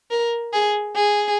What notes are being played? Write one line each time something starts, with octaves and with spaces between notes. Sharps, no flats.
A#4
G#4
G#4